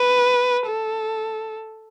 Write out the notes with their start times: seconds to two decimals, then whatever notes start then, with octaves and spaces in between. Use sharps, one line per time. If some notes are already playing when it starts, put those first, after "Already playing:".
Already playing: B4
0.67 A4